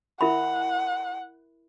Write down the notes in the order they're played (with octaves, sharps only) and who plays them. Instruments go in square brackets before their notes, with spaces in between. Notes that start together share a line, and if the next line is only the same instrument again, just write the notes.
[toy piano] E4 A#4 E5 B5 [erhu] F#5